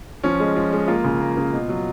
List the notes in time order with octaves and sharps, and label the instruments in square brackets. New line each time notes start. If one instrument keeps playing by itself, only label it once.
[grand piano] F3 C#4
G#3
F3
G#3
A#3 F4
C#3
A#3
C#3
B2
F#3